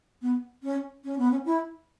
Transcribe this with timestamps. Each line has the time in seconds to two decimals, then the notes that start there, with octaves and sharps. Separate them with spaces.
0.22 B3
0.63 C#4
1.04 C#4
1.19 B3
1.31 C#4
1.46 E4